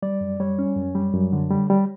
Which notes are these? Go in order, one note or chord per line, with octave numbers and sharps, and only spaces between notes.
G3 D5
F#2
G3 C#5
C#4
F#2
G3
F#2
D3
G3
G3